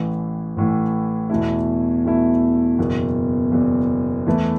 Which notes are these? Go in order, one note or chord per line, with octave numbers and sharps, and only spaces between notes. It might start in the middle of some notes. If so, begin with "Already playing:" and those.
Already playing: A1 A2 E3
A1 A2 E3
E2 B2 A3 E4
E2 B2 A3 E4
F#1 E2 B2
F#1 E2 B2
E2 E3 A3 E4 B4